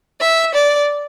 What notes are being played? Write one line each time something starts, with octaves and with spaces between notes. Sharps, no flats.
E5
D5